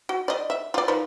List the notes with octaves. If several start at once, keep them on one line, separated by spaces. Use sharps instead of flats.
F#4
D5 D#5
E5
F4 D5
D#3 F3 B4